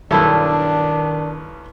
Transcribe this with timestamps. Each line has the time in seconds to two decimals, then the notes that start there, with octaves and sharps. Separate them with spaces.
0.11 B1 G2 D#3 D4 E4 A4